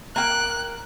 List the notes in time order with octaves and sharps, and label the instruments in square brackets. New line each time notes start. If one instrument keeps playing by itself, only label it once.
[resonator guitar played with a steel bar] A#3 G5 [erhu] F#6